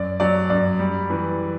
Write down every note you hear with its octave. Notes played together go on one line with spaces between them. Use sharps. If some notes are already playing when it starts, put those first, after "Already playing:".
Already playing: F#2 D5
F#3 D5
F#2 D5
G3
E3